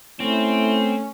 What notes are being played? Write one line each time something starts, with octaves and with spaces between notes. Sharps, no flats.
A3 C4 C#4 E4